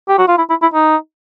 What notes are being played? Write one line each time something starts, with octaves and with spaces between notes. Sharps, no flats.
G4
F#4
F4
E4
E4
E4
D#4